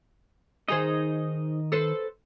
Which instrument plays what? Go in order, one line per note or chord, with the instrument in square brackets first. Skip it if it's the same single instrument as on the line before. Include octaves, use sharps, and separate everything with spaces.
[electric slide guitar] D#3 D#5 [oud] D#4 G#4 C5
[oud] A4 B4 C5